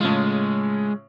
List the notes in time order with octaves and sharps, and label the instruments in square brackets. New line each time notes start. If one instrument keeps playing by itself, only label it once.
[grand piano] A2 C#3 F4 [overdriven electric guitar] G#3